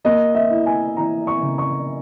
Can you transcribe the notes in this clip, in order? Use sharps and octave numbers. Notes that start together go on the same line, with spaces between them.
A#3 D#5
E5
E4
G#5
E3 A#5
C#6
C#3
C#6